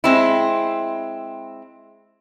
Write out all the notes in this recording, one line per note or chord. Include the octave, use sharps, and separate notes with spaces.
G#3 C4 E4